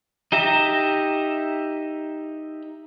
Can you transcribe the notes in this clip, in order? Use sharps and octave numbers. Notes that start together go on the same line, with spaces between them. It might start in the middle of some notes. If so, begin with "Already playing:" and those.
D#4 G4 E5 A#5